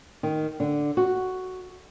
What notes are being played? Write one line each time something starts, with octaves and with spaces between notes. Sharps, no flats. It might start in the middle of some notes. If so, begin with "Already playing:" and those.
D#3
D3
F#4